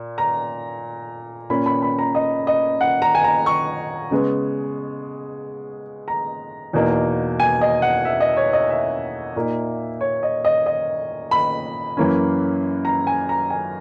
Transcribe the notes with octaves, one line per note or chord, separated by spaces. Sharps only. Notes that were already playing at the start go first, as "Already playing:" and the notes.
Already playing: A#2
A#5
A#2 A#3 C#4 B5
B5
B5
A#5
D#5
D#5
F#5
A#5
G#5
A#5
C#6
C#3 G#3 B3
A#5
E2 B2 A#3 D#4
G#5
D#5
F#5
E5
D#5
C#5
D#5
E5
A#2 A#3 D#4
C#5
D#5
D#5
D#5
B5
F#2 E3 A#3 C#4
A#5
G#5
A#5
G#5